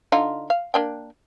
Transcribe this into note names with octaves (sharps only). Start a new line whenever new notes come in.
D3 D#4 F4
F5
A#3 D4 G5